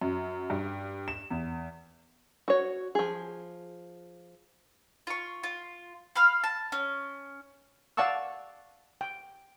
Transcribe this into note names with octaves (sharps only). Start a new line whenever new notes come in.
F#2
G2
E7
E2
F#4 C#5
F3 G#4
F4 C#6
F4
F5 B5 F6
A5
C#4
D5 F5 F#5 A5 C#6 E6
G5